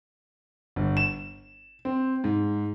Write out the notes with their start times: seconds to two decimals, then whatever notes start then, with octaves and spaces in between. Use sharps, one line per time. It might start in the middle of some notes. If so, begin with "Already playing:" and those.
0.76 G1
0.97 E7
1.85 C4
2.24 G#2